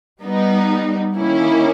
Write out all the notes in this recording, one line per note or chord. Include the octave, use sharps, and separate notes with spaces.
G3 B3 D#4
D#3 A#3 C#4 E4